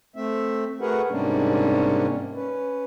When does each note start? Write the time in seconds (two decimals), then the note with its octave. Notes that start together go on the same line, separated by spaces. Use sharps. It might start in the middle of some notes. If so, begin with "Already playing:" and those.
0.16 A3 C4 E5
0.81 A3 F#4 G#4 A#4 B4 F#5
1.10 G#2 C3 G3 A#3 C#4 D4
2.35 C#4 B4